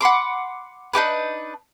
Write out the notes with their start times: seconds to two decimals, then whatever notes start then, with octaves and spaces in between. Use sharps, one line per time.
0.01 F#5 B5 C6 D6
0.93 D4 D#4 G4 B4